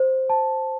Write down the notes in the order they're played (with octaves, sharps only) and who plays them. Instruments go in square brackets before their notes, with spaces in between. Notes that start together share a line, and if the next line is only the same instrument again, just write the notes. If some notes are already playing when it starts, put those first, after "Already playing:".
Already playing: [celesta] C5
A5